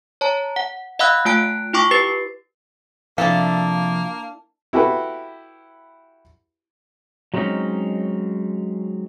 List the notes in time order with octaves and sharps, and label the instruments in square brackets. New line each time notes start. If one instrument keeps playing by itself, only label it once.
[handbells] C#5 A5 A#5
F#5
D#5 F5 F#5 B5 E6 F#6
A3 F4 G5 A5 F#6 D7
E4 F4 G5 C#6 D6
G4 B4 A6 C7
[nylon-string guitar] C3 F3 [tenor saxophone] A#3 [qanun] D4 E4 A4 [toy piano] F5
[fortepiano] E4 F#4 G4 A4 B4
[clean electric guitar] F#3 G#3 C4 C#4 D#4